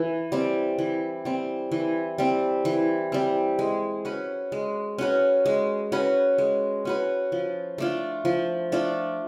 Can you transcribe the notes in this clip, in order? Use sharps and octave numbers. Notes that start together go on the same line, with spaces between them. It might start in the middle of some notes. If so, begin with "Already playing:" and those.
Already playing: E3
G3 C4
E3
G3 C4
E3
G3 C4
E3
G3 C4
G#3
C#4 F#4 B4
G#3
C#4 F#4 B4
G#3
C#4 F#4 B4
G#3
C#4 F#4 B4
F3
A3 D4 F4
F3
A3 D4 F4